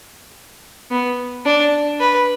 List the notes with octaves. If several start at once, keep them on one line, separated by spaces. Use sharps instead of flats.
B3
D4
B4